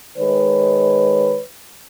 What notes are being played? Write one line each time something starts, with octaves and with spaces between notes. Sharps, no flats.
D#3 G#3 B4 C#5